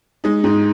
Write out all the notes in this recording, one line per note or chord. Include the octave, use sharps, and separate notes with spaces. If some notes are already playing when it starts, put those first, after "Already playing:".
G#3 D#4
G#2 D#4